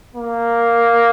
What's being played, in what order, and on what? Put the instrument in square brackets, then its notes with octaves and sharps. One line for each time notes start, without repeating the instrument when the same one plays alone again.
[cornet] A#3